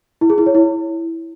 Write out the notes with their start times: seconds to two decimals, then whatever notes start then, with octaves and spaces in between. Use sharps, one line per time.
0.21 E4
0.30 G#4
0.38 E4
0.46 C#5
0.55 E4